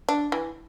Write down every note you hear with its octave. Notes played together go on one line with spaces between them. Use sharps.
D4
E3